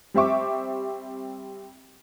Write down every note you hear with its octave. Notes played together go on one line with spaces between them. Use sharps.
G3 C4 E5 C#6 D6